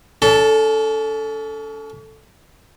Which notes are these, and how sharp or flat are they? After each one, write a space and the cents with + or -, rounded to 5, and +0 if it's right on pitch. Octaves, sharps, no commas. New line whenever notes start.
C#4 +40 A4 +0